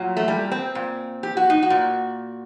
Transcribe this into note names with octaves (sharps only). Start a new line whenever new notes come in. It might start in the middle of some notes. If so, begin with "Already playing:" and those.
Already playing: A#2 F#3
A3
G3
C4
A#2
G4
F#4
D#4
F#4
A#2